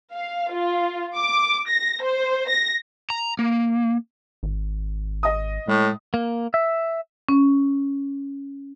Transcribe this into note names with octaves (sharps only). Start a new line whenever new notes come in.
F5
F4
D6
A#6
C5
A#6
A#5
A#3
G#1
D#5 D#6
A2 G#3
A#3
E5
C#4